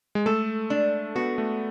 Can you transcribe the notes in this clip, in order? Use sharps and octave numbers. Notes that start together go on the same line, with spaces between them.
G#3
A3 A4
D4
B3 F#4
A3